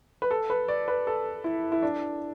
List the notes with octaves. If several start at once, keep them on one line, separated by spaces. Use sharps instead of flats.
B4
A4
B4
D5
B4
A4
E4
E4
D4